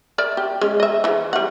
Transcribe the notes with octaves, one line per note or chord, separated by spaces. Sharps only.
A#4 D5 E5
G4
G#3 C#4
D#5 E5
E3 F3
G3 F#5